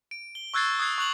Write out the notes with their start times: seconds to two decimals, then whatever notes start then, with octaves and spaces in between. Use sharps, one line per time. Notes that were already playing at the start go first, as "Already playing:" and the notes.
0.11 D7
0.35 G7
0.54 C#6 E6 F#6 G#6 A6 C7
0.80 D#6 E6 F#6 G#6 C7
0.98 C#6 F#6 F7 F#7